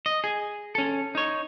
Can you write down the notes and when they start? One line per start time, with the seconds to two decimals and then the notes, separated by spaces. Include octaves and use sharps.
0.06 D#5
0.24 G#4
0.75 C#4 A4
1.15 D#4 C#5